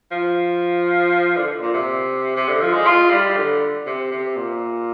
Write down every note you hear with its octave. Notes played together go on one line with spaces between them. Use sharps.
F3
D3
A#2
C3
C3
D3
F3
G#3
F4
G3
D3
C3
C3
A#2